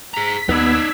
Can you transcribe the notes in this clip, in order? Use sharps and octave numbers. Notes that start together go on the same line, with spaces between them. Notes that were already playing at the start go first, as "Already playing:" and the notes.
G#4 A#5 B6
D#2 B3 D#4 D5 E6 G#6 B6